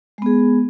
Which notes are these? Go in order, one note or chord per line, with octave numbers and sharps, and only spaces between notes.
G#3 B3 G#4